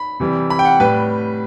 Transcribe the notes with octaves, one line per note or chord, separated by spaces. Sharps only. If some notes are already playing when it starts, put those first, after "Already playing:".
Already playing: B5
C3 E3 G3
B5
G5
F#5
A2 G3 B4